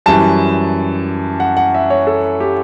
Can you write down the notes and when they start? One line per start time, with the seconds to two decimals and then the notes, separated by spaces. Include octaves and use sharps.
0.06 F#2 E3 G3 A5
1.40 F#5
1.57 F#5
1.74 E5
1.90 C#5
2.07 A4
2.40 G4